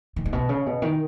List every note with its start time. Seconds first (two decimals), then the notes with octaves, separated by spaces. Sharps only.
0.16 D#3
0.26 G#2
0.33 B2
0.49 C#3
0.66 B2
0.82 D#3